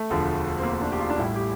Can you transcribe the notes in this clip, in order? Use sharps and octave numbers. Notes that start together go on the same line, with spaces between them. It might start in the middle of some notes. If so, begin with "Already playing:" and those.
Already playing: A3
E1 D2 D3 F3
C4
A#3
D4
G4
F4
D4
A1 A2 G3 E4
G4